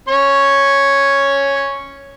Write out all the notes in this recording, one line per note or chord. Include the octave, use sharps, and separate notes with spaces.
C#4 C#5 C#6